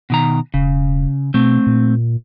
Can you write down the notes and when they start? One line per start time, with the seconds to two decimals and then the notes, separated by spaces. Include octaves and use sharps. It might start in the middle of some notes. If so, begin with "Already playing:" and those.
0.10 B2 D#3 A#5
0.54 E1 C#3
1.34 B2 A3 C4
1.67 A#2